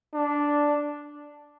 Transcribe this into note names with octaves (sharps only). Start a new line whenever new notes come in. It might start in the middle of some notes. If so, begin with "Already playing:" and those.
D4